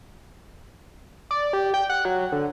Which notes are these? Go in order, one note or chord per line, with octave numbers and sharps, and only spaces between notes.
D5
G4
G5
F#5
F#3
D3